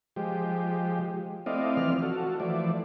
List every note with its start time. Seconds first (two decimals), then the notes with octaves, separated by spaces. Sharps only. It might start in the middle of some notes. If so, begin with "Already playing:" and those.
0.16 F3 G#3 G4
1.46 A3 C4 E4 D5 D#5 F5
1.77 E3 F3 C4 D5 F6
2.02 F#4 A4
2.40 E3 F3 A3 D5